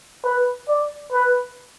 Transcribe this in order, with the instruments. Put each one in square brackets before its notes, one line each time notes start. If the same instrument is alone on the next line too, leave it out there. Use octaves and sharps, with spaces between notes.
[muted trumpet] B4
D5
B4